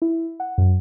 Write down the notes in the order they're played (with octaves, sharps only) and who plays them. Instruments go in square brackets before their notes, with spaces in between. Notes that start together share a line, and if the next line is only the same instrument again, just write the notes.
[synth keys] E4
F#5
F#2